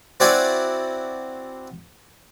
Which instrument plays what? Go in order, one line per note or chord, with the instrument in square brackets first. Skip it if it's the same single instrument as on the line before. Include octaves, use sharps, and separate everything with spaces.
[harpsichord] C4 E4 F#4 D5 F#5 G#5